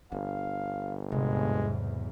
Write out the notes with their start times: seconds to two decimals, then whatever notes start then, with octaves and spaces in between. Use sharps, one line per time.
0.12 G1 D4 F5
1.12 B1 E2 G#2 C3 G#3